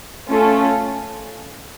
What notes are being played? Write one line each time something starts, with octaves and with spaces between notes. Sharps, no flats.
A3 C#4 F4 A4